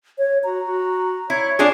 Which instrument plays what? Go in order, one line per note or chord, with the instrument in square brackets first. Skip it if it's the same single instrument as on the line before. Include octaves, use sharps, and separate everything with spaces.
[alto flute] C#5
[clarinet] F#4 [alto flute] A#5
[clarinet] F#4
[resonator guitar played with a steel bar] E4 [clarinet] C#5
[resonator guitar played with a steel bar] D4 F4 G#4